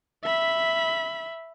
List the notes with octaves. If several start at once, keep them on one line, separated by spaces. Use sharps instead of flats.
E5 B5